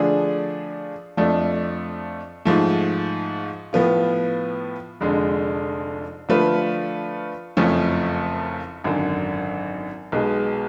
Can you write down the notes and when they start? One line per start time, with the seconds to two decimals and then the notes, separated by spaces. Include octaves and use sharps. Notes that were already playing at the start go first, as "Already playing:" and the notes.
Already playing: D3 F3 A3 D4 G#4
1.17 F2 F3 A3 D4
2.45 G#2 F3 A3
3.73 A2 F3 B3 F4
5.01 F1 F2 D3 G#3
6.29 D3 F3 A3 F4 B4
7.57 F#1 F2 F3 A3 C#4
8.84 G#1 F#2 D3
10.12 B1 B2 G#3